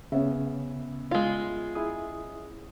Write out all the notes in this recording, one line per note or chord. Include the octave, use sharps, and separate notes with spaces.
C#3 B3 C#4 E5
G#3 F4
E4 G#4 D#6